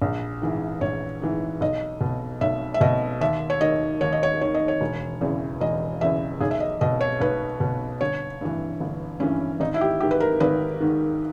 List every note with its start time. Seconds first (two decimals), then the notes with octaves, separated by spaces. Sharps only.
0.02 A#1
0.42 G#2 E3
0.81 A#1 C#5
1.22 G#2 E3
1.61 B1 D#5
2.01 B2
2.41 B1 E5
2.74 E5
2.81 B2 D#5
3.21 D#2 E5
3.50 C#5
3.61 D#3 D#5
4.01 D#2 C#5
4.12 D#5
4.23 C#5
4.41 D#3 C#5
4.54 D#5
4.68 C#5
4.81 E1
5.21 E2 C#3 E3
5.61 E1 D#5
6.01 E2 C#3 E3 E5
6.41 B1 G#4
6.51 E5
6.60 D#5
6.81 B2 D#5
7.01 C#5
7.20 B1 B4
7.60 B2
8.01 G1 C#5
8.41 G2 E3
8.81 G1
9.20 G2 E3 C#4
9.60 G#1 D#4
9.74 E4
9.81 G4
10.00 G#2 D#3 G4
10.11 B4
10.20 A#4
10.40 G#1 B4
10.80 G#2 D#3